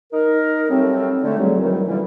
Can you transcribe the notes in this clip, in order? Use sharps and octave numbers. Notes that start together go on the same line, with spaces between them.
D#4 A#4
F#3 G3 A3 C4
D3 A3
C#2 F#3 G3
F#2 D#3 E3 F#3 G3
A#2 D3 E3 G3